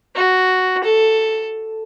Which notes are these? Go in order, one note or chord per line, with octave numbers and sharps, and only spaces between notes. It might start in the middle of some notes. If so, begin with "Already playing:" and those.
F#4
A4